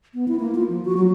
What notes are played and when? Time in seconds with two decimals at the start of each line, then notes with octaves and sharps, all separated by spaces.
0.14 B3
0.28 E4
0.39 A#3
0.55 F4
0.69 F3
0.85 F#4
0.97 F#3